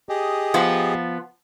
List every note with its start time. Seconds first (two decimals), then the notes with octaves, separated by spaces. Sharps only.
0.09 G4 G#4 D#5
0.54 F3 B3 F4